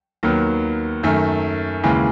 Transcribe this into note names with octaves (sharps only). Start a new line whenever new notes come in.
D#2 D#3 F#3 B3
F#2 D#3 A3
D#2 C#3 E3 G#3